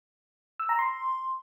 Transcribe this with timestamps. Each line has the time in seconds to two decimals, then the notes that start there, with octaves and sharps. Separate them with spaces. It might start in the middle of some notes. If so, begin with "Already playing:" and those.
0.60 E6
0.69 A#5
0.79 C6